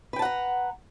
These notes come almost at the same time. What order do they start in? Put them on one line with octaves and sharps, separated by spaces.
B4 G5 A5 F#5 A#5